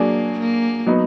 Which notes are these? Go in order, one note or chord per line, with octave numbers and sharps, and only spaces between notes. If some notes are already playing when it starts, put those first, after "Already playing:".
Already playing: F#3 A#3 D4 G#4 D5
A#3
F#3 B3 D#4